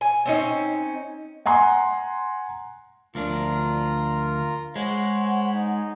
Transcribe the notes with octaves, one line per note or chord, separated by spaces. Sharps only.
G#5
C4 C#4 D#4
F#5 G#5 A#5 C6
D2 F3 D4 F4 A#4 A#5
G#3 C5 C#5 F#5 B5
D#4